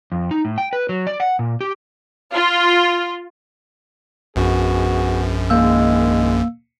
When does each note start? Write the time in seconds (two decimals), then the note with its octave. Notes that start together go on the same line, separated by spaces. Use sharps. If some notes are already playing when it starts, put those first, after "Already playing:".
0.12 F2
0.31 D#4
0.45 A2
0.58 G5
0.73 B4
0.89 F#3
1.07 D5
1.20 F#5
1.39 A#2
1.61 G4
2.35 F4
4.36 A#1 F#2 B3 F#4 G#4
5.50 D#3 G#3 A#3 F5 E6